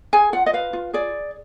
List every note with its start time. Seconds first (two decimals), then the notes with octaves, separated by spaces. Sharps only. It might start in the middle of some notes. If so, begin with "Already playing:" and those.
0.13 G#4 G#5
0.33 F4 F#5
0.46 D#5
0.53 B4 F5
0.73 F4
0.93 G#4 D5